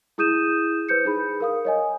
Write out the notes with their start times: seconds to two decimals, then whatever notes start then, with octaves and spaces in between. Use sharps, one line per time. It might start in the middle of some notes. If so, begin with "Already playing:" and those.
0.18 E4 G#4 D#6 G6 D#7 E7
0.89 B4 C5 G6 C#7
1.05 D#4 G#4 B5
1.40 A#4 F5 D#6
1.65 C#5 D#5 G#5